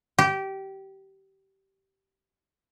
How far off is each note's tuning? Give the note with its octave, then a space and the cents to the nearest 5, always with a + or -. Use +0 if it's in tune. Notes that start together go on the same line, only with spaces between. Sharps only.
G4 -20